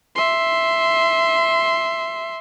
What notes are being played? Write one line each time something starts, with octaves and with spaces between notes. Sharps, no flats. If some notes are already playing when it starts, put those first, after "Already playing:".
E5 C6